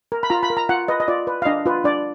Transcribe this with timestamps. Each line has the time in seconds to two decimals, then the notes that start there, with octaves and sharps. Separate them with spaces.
0.12 A#4
0.23 B5
0.30 F4 A#5
0.43 B5
0.50 A#4
0.57 A#5
0.69 F4 F#5
0.88 B4 D#5
1.00 D#5
1.08 F4 D5
1.27 B4
1.42 F5
1.46 D4 D#5
1.66 F4 B4
1.84 D4 D5